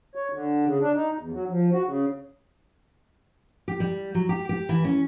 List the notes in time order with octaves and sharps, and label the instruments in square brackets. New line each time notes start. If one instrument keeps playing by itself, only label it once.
[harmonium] C#5
D3
C#3
D4
D#4
E2
F#3
F3
F#4
C#3
[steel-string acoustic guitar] G4
G3
F#3
G4
G4
E3
C#4